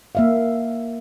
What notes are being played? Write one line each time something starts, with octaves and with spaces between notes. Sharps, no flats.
A#3 E5 F5